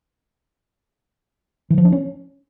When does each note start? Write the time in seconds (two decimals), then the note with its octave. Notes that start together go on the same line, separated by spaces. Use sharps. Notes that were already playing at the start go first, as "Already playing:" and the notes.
1.70 E3
1.78 F3
1.85 D4
1.92 C#4